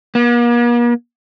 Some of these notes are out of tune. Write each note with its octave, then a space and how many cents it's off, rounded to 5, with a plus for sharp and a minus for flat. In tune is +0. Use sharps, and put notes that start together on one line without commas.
A#3 +45